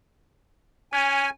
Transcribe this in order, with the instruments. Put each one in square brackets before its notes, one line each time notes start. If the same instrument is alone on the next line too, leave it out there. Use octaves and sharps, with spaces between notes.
[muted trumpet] C#4 [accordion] G#5